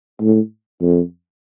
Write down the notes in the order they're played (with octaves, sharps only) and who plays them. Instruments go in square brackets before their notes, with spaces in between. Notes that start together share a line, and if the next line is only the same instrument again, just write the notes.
[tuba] A2
F2